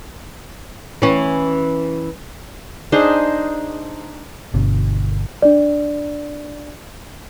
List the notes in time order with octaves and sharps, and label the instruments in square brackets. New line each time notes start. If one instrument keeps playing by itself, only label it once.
[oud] E3 C#4
[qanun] D4 D#4 G#4 C5
[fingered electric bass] G1 B2 D3
[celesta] D4 D5